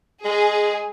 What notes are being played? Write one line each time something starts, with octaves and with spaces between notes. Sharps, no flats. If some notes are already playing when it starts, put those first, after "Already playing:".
G#3 G#4